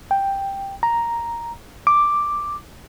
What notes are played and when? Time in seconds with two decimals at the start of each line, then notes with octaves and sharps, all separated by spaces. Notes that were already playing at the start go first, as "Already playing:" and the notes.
0.11 G5
0.83 A#5
1.87 D6